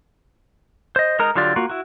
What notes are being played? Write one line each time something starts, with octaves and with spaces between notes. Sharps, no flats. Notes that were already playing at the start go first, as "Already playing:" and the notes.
C5 D#5
G#3 D#4 A#4 A#5
D3 F#3 F4 G4 D5
A#3 F4 F#4
E4 F#4